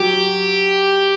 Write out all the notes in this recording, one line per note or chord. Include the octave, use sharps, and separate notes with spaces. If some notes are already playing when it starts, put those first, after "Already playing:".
Already playing: F#3 G4